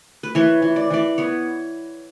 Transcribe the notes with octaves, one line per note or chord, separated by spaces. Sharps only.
B4
E3 C#5
E3
D5
E3 D5
B3 C#5